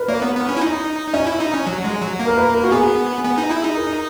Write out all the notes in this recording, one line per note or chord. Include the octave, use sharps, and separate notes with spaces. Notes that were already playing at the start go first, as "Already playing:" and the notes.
Already playing: A#4 B4
A#3 C#5
B3
B3
C#4
E4
D#4
C#4 D#5
E4
D#4
C#4
F#3
G#3
F#3
A#3
A#4
B4
A#4
F#4
B3 G#4
B3
D#4
E4
D#4
A#4